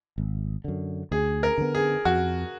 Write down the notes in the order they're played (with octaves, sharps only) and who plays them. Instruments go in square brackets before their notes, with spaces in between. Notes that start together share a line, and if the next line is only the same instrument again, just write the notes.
[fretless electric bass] G#1
F#2 D3
[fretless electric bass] D2 [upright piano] G#4
[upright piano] A#4
[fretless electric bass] D3 G#3 B3
[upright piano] G#4
[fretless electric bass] F2 [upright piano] F#4